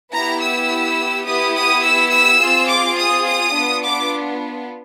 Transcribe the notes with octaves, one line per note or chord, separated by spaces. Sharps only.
B3 E4 G4 A#5
E6
B3 E4 G4 D#6
D#6
E6
E6
C4 F4 G#4
D6
D#6
D#6
B3 D4 F4
D6